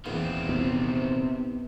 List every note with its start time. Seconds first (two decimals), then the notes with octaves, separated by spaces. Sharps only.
0.06 E2 A#2 D#3 C4
0.49 C3 B3